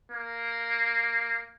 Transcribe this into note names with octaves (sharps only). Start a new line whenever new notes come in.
A#3